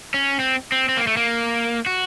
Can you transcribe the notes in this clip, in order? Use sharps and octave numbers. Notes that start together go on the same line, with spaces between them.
C#4
C4
C4
C4
A#3
A3
A#3
F#4